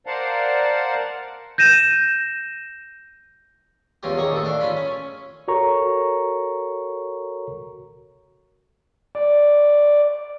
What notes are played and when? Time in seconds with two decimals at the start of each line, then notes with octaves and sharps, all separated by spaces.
0.07 A#4 C5 D5 F5 F#5 A5
1.58 G6 A#6 D#7 E7
4.03 E2 C#4 F4 G4
4.18 D#3 G#4 C#5 D6
4.32 D#2 A2 A4
4.45 D4 F5
4.61 C#4 F4 B5
4.77 C#4
5.48 F#4 A4 A#4 C#5 A#5 C#6
9.15 D5